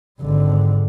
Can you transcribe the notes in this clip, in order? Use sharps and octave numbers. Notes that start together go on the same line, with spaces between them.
G#1 D3